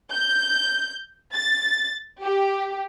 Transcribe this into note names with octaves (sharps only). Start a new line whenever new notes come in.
G6
A6
G4